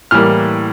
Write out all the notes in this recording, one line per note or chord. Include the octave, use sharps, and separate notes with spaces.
A2 E3 G3 A#3 F6